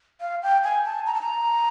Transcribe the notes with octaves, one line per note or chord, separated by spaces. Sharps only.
F5
G5
G#5
A5
A#5
A5
A#5